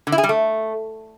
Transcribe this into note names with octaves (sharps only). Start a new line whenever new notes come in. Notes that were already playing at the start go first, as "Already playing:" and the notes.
D3
E4
G#4
G3
A3